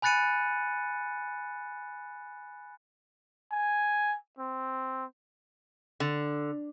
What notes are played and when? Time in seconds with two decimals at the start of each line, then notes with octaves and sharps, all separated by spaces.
0.02 G#5 B5 F#6 A6 C#7 D#7
3.51 G#5
4.39 C4
6.00 D3